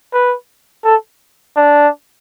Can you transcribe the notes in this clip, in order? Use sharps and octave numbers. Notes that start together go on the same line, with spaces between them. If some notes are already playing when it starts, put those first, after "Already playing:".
B4
A4
D4